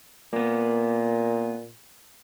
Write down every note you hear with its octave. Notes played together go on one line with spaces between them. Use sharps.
A#2 A#3 B3